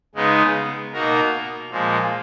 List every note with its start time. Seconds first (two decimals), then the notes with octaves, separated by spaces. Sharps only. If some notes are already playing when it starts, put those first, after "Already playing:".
0.15 C#3 G#3 B3 D#4
0.93 B2 A#3 D#4 F#4 A#4
1.71 A#2 F3 G#3